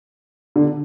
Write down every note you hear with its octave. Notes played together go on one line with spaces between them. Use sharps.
D3